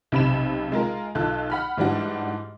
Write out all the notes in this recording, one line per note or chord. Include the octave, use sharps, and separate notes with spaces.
B1 C3 B5 E7
G#3 F4 A#4
B1 F4 A4 F#6
F#5 B5 F6
G#2 E3 G3 D4 F#4